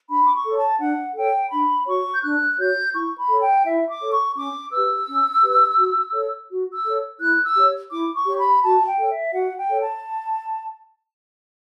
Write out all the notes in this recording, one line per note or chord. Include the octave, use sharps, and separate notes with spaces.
D4 B5
D6
C#6
A4 C#5
A5
D4 F#5
A4 C#5 G5
D4 B5
F#4 C#5 C#6
G6
D4 F#6
F#4 C#5 G6
E4 C#6
B5
A4 C#5
G5
E4 E5
D6
A4 C#5
C#6
C#4 D6
G4 B4 E6
C#4
G4 B4
F#4
A4 C#5
F#4
E6
A4 C#5
E4 F#6
E6
G4 C#5
E4 D6
C#6
G4 C#5
B5
F#4 A5
G5
A4 C#5
E5
F#4 F#5
G5
A4 C#5
A5